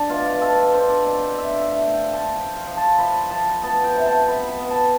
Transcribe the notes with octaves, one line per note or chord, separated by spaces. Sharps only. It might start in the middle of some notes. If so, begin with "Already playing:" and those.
Already playing: D4 D5
B2 F4
F4
B2 A4
D4 C5
D5
C4 D5
D3 E5
A3 F5
G5
C4
A5
F3 G5
F5
F3
A5
F3 B5
F3 A5
B3 A5
G5
C3
A5
B3 B5
B5
B3
A5